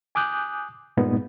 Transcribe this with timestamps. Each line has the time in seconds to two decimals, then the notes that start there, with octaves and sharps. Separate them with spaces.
0.15 G#5 D6 D#6 F#6 G6
0.97 G2 A#2 G#3 B3 D#4